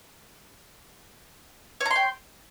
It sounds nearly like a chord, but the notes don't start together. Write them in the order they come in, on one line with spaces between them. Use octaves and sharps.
C#5 A#5 C6 G5